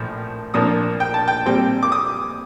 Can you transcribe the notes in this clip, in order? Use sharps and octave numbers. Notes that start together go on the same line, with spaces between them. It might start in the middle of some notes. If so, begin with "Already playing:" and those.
Already playing: A#1 A2 F3
A#1 A#2 F3 A#3 D4 D#6
G5
A5
G5
A#2 G3 C4 G5
D6
D#6